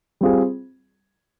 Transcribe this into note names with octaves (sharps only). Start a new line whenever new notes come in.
G3 C4 F4 G#4